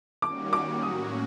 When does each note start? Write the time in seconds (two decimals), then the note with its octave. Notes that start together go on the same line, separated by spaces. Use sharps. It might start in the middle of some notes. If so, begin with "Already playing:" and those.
0.22 D#3 G3 A#3 C#4 F#4 D6
0.53 D6
0.82 A2 F#3 A#3 C#4 F#4 D#6